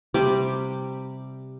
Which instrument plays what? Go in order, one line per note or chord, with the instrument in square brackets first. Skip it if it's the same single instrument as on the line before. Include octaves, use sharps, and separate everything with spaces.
[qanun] C3 G3 D6